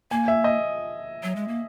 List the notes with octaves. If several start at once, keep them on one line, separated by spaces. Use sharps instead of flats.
A#3 G#5
E5
D#5
F#3
G#3
A#3